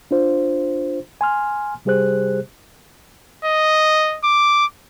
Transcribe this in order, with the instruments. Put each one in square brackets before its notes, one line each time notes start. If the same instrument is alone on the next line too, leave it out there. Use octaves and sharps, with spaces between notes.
[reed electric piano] D4 F4 C5
G#5 C6 F6
C3 G3 G4 G#4 C5 F#6
[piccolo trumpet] D#5
D6